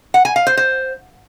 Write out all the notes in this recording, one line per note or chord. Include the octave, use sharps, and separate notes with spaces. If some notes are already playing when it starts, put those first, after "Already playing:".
F#5
G#5
F5
C5
C5